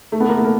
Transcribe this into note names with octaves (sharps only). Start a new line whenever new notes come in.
A3
B3
A#3
A3
A#3